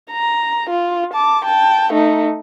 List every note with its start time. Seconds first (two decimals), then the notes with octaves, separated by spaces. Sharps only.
0.11 A#5
0.70 F4
1.14 A5 D6
1.44 G5 A5
1.93 A3 D#4